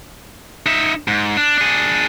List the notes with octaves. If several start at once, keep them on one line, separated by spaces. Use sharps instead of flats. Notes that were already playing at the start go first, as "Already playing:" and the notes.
D#4 E5
G#2
D4
D4 G#4